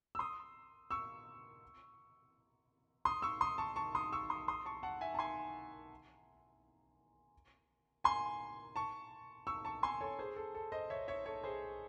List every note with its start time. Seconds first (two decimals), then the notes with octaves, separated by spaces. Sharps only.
0.15 E6
0.19 C6 D#6
0.91 C#6 E6
3.05 C6 D#6
3.22 C#6 E6
3.41 C6 D#6
3.58 A5 C#6
3.76 A5 C#6
3.95 C6 D#6
4.12 C#6 E6
4.30 C6 D#6
4.48 C6 D#6
4.66 A5 C#6
4.83 F#5 A5
5.01 E5 G#5
5.14 A5
5.19 G#5 C6
8.04 G#5 C6
8.76 A5 C#6
9.47 C#6 E6
9.65 A5 C#6
9.83 G#5 C6
10.01 A4 C#5
10.19 G#4 C5
10.36 A4
10.55 A4
10.72 C5 D#5
10.90 C#5 E5
11.08 C#5 E5
11.26 A4 C#5
11.43 G#4 C5